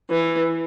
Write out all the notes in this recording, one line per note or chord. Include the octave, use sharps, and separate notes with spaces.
E3